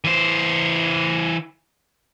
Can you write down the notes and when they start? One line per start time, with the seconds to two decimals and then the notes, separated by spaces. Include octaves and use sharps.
0.04 E3 C5